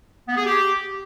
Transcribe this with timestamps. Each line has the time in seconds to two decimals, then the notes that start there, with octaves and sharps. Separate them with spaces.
0.28 B3
0.37 G#4
0.46 G4